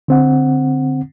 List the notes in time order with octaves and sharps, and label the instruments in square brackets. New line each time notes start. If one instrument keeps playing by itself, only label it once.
[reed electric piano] D3 C4 F#5